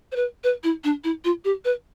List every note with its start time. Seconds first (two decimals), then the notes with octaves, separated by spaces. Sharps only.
0.12 C5
0.16 B4
0.44 B4
0.64 E4
0.84 D4
1.04 E4
1.25 F4
1.45 G4
1.65 B4